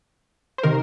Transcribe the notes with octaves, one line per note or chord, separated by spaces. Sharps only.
C5
C3 D#3 A#4